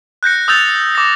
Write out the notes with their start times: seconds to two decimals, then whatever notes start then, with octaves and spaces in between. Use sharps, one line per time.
0.23 F#6 G6 A#6 C#7
0.48 D#6 E6 G6 A6 F7
0.95 D6 A#6